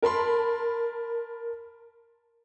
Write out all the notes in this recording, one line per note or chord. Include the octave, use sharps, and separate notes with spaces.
A#4 A5 B5 C6